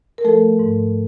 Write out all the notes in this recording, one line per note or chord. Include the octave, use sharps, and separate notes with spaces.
A#4
F3 A3 A4
G#2